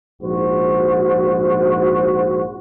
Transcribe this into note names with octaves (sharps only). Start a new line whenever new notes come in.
A#1 G#2 F#4 C5